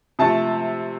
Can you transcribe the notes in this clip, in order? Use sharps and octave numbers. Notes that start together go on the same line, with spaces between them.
C3 F3 A3 A5